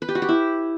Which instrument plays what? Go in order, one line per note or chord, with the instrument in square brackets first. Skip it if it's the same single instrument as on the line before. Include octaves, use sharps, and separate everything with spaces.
[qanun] B4
G4
F#4
G4
E4